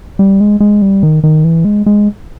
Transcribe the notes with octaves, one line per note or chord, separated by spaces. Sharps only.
G3
G#3
G#3
G3
D#3
D#3
E3
G#3
G#3